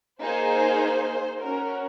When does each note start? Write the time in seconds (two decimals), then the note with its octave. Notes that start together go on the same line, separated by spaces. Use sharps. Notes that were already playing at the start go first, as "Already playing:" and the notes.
0.21 A#3 D#4 G#4 C5
1.40 C#4 F#4 A#4